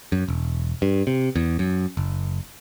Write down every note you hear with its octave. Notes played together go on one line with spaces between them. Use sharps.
F#2
E1
G2
C3
E2
F#2
F#1